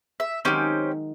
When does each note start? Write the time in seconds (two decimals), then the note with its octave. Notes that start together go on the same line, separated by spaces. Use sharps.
0.20 E5
0.45 D#3 F#3 G#3 C4 C#4 G4